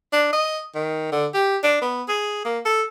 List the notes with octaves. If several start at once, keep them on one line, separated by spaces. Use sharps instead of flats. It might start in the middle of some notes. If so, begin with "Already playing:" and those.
D4
D#5
D#3
D3
G4
D4
B3
G#4
A#3
A4